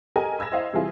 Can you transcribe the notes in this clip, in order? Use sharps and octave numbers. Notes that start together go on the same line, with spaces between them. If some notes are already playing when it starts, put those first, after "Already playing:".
G4 A4 A#4 D#5 G#5
B5 E6 G#6 A#6 E7
E4 C5 D#5 F5
C3 E3 G3 E4 F4 G#4